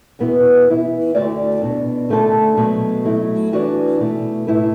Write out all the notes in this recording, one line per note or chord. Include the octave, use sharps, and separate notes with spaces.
E2 B2 B3 E4 B4
E3 B3 E4
D2 D3 A3 F#4 D5
B2 B3 D4
D3 A3 D4 A4
B2 F#3 A3
F#3 A3 E4
E3 D4 F#4 B4 D5
B2 A3 E4
A2 A3 E4 B4